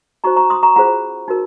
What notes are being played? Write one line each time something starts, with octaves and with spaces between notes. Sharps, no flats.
D#4 F#4 C5 A#5 C#6
A#5 C#6
C6 D#6
A#5 C#6
C#4 F4 G#4 C5 F#5 A#5
D#4 F#4 A#4